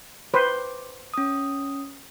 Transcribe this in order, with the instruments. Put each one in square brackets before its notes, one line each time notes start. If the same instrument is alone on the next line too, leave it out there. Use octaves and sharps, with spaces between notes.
[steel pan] B4 C5 [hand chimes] D6
[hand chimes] C#4 D#6